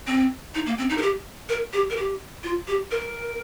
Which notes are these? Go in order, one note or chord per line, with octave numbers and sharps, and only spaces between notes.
C4
D#4
A#3
C4
D#4
A#4
G4
A#4
G4
A#4
G4
F4
G4
A#4